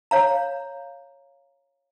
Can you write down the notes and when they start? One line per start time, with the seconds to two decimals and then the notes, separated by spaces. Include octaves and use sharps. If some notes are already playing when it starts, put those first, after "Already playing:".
0.11 C#5 F5 A#5